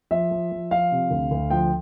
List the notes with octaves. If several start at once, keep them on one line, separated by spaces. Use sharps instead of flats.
F3 E5
F3
F3
F3 F5
C3
D2
D2
F3 G5